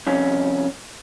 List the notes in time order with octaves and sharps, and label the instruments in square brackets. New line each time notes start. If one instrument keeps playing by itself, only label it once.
[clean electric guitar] C2 F2 C#4